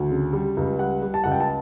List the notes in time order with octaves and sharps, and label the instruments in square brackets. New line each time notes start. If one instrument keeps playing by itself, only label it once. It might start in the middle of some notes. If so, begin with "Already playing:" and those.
Already playing: [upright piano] D2
C#3
G3
C#2
G3 F#5
G3
A5
C#2 F#5
G5
A5